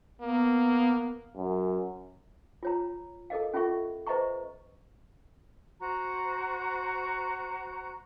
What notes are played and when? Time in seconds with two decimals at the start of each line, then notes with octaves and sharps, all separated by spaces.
0.21 A#3 B3
1.37 F#2
2.63 F4 C#5 A#5
3.30 A4 A#4 D#5 F5
3.54 C#4 F4 A4 E5 C#6
4.07 B4 C5 D#5 E5 A#5 C#6
5.80 F#4 C5 A#5